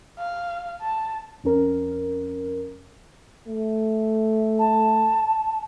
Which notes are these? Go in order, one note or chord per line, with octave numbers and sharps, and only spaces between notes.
F5
A5
F2 C#4 A#4
A3
A5